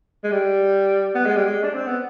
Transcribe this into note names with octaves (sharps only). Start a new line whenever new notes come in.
G#3
G3
B3
G#3
G3
G#3
D4
C4
B3